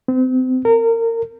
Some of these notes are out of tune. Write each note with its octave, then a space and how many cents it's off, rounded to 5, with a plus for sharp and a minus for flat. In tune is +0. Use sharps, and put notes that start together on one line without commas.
C4 -35
A#4 -25